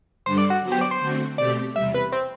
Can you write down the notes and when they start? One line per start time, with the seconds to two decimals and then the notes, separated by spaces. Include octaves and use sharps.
0.25 G2 D3 G3 D4 A4 C5
0.38 D5
0.50 F#4
0.63 F#3 B3 F#4 C5
0.72 G4
0.81 D5
0.91 C5
1.00 D3 A3 C4 F#4
1.38 B2 A3 C4 G4 D5
1.75 E2 C3 G3 E5
1.94 B4
2.12 C4